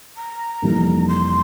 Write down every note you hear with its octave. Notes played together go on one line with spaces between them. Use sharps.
A#5
F1 F2 E3 G3 A#3
C6